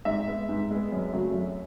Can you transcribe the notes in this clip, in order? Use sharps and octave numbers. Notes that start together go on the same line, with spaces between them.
G#2 E5
G#3 B3
G#2
G#3 B3
F#2
C#3 F#3 A3
F#2